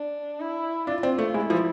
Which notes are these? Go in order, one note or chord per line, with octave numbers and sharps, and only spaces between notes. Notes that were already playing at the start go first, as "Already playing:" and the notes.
Already playing: D4
E4
D4 F4
C4
A3
G#3 E4
F3